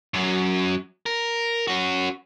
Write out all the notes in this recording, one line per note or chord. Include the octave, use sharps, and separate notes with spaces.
F#2 F#3
A#4
C#4 F#4